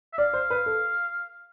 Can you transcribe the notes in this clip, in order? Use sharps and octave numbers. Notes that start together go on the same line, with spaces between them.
E5
D5 F5
C5
B4
A4